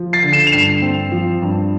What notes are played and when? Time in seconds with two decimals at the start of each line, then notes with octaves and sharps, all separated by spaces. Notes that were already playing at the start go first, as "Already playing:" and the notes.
Already playing: F3
0.13 A6 C7
0.22 D3
0.33 C7 E7
0.47 F7
0.52 G2 C7 E7
0.82 C4
1.12 F3
1.42 G2